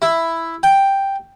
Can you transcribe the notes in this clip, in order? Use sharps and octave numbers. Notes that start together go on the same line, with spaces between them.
E4
G5